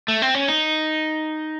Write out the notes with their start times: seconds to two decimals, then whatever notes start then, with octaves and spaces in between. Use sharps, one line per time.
0.08 A3
0.22 C4
0.35 C#4
0.48 D#4